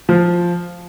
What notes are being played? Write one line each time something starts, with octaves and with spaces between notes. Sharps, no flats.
F3 F4